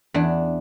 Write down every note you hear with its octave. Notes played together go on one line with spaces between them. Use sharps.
E2 D4